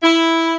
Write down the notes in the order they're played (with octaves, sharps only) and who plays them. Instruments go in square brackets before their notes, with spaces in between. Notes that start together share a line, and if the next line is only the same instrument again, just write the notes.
[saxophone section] E4